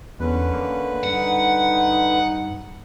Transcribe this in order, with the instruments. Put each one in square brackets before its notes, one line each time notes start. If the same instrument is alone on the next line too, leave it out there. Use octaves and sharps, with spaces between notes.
[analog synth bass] E2 [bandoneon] D3 B4 [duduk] C#4
[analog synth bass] A#3
[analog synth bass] G2 [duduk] D#4 [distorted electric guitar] F#5